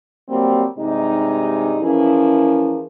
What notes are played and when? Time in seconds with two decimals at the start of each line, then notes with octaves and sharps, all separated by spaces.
0.28 F#3 G3 A#3 C4
0.77 G2 C3 G#3 D#4
1.81 E3 F3 C#4 E4 G#4 A#4